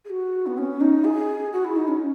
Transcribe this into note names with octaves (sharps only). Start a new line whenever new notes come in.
G#4
F#4
B3
C#4
D#4
G#4
F#4
E4
D#4
C#4